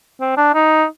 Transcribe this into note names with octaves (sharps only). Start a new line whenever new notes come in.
C4
D4
D#4